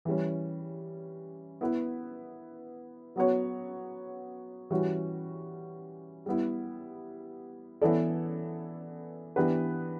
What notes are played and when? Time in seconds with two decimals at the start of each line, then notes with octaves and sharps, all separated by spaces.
0.05 E3 G3 C#4
1.61 B3 E4 B4
3.16 F#3 B3 F#4 C#5
4.70 E3 G3 C#4 F#4
6.26 G3 B3 E4
7.81 E3 B3 E4 A4 D5
9.36 E3 B3 D4 G4 B4